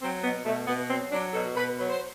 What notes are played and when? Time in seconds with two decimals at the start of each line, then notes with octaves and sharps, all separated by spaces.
0.02 F#3 C4
0.24 B2 B3
0.46 B2 A3
0.68 B2 B3
0.90 F#3 C4
1.12 F#3 D4
1.34 B2 A4
1.56 B2 B4
1.79 F#3 B4
1.90 C5